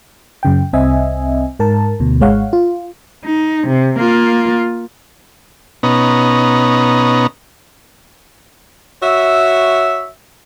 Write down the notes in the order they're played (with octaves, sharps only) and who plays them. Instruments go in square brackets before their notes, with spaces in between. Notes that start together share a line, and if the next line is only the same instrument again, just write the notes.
[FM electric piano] F#2 C#3 G5
C2 C4 D#5 E5 G#5
G#2 A#4 A5
D2 B2
G#1 G#2 G#3 C#5 F5 F#5
F4
[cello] D#4
C3
A#3 F4
[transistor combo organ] B2 B3 C#4 D#4 A#5
[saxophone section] F#4 C#5 E5